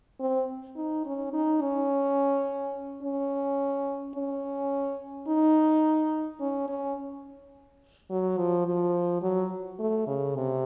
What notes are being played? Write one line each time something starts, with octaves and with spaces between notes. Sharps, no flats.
C4
D#4
C#4
D#4
C#4
C#4
C#4
D#4
C#4
C#4
F#3
F3
F3
F#3
A3
C#3
C3